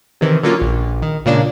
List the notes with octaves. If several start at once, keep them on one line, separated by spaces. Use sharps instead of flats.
C3 D#3 E3
D3 F#3 A#3 C#4 F4
A#1
D#3
A#2 C#3 G#3 A#3 D4